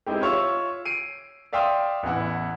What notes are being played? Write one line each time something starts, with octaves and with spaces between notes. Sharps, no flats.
G#3 C4 D#4 E4 G4
F4 C#5 E5 E6
C7 D7 D#7
D5 E5 F5 G5 C6 D#6
A1 E2 E4 F#5